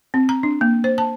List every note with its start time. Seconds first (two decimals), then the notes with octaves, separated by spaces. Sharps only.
0.14 C4
0.29 A#5
0.43 D4
0.61 A#3
0.84 C5
0.98 A5